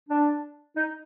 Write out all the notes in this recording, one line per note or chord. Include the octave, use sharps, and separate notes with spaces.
D4
D#4